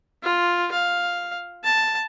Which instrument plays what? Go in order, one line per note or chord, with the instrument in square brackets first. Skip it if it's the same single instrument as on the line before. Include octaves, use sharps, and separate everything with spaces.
[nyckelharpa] F4
F5
A5